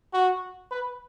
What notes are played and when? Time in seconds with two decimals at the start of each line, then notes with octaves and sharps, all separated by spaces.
0.13 F#4
0.71 B4